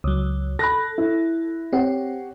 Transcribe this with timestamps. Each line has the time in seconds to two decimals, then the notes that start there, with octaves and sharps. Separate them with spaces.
0.04 C#2 F#3
0.59 A4 B5 F#6 A#6
0.98 E4
1.73 C4 G4 C#5 F#5